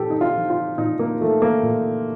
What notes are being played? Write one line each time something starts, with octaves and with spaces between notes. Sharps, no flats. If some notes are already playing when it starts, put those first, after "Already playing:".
Already playing: A#2 F3 G4 A4
D#4
F4
F3
F4
A#2 D#4
A#3
F3 A3
A#3
A#2